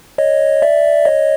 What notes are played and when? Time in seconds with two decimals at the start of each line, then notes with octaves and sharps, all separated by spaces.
0.18 C#5 D#5
0.62 D5 E5
1.05 C#5 D#5